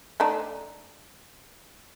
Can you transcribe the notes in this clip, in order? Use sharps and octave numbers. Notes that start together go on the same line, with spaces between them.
A3 D4 D#4